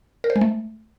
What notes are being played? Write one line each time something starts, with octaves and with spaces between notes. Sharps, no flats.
A#4
C5
G#3
A3